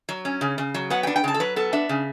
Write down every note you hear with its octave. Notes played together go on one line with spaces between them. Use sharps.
F#3
C#4
C#3
C#3
F#3
B3 F#5
G5
D4
G5
C#3 A5
A4
F#3 B4
B3 A4
D4 E5
C#3